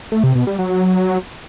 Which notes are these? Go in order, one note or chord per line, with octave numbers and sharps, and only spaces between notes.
A3
C3
B2
G3
F#3